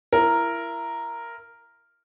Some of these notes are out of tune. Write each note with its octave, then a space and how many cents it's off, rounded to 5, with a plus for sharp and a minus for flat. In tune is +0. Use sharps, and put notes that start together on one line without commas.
E4 +30 A#4 +0